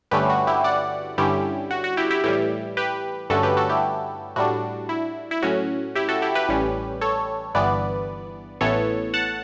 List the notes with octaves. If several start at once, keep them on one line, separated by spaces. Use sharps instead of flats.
G2 D3 A3 C#4 G4 B4
F#4
E4 G4
D5 F#5
G2 D3 G3 C#4 E4 G4
F#4
F#4
E4 G4
E4 G4
A2 E3 G3 E4 G4
G4 B4
G2 D3 A3 C#4 F#4 A4
G4 B4
F#4 A4
E4 G4
A2 G3 D4 F#4
E4
E4
A2 F#3 C#4 F#4
E4 G4
F#4 A4
E4 G4
G4 B4
A1 A2 G3 C#4
A4 C#5
G1 G2 E3 B3 B4 D5
A1 A2 E3 B3 A4 C#5
F#5 A5